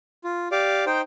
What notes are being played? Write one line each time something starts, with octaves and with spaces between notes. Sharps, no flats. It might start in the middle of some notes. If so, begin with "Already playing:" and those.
F4
G4 D5 F5 D6
D#4 C5 G5